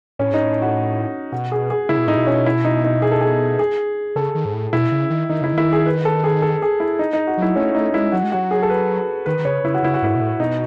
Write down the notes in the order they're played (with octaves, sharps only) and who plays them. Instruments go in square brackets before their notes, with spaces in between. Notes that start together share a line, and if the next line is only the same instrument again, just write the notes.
[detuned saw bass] A2 [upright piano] C#4
[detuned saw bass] G#2 [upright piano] D#4
[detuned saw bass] A2
[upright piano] F#4
[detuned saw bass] B2 [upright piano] F#4
[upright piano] G#4
G#4
[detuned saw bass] C#3 [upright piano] E4
[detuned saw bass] B2
[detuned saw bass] A2 [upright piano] D#4
[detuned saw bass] B2
[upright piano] C#4
E4
D#4
D#4
G#4
A4
G#4
G#4
[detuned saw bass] C#3 [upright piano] A4
[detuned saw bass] D#3
G#2
A2
[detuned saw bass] B2 [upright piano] E4
[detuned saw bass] C#3
D#3
[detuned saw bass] D#3 [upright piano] D#4
[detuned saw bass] C#3 [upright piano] E4
[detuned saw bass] D#3 [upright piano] E4
[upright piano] G#4
B4
A4
G#4
A4
G#4
E4
D#4
D#4
F#4
[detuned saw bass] F#3 [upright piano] E4
[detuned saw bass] A3 [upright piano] C#4
[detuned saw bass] A3 [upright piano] D#4
[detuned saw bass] G#3 [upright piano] E4
[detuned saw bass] F#3 [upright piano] F#4
[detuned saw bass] G#3
[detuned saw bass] F#3 [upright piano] F#4
[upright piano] G#4
A4
B4
[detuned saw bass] D#3 [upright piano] B4
[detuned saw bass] D#3
[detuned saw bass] C#3 [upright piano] C#5
[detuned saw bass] C#3 [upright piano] E4
[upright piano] F#4
[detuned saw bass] C#3 [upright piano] E4
[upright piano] F#4
[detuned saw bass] G#2 [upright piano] E4
[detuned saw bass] B2
A2
[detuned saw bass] B2 [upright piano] D#4